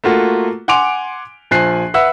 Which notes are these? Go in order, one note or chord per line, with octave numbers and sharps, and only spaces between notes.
A3 A#3 F4 F#4
F#5 G#5 C6 D6 D7 F7
A#1 F3 G#5 F#6 C7
B4 E5 F#5 E6